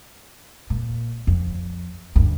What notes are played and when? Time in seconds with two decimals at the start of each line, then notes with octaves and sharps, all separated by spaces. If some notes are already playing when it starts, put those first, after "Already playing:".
0.70 A#2
1.27 F2
2.15 D2 G2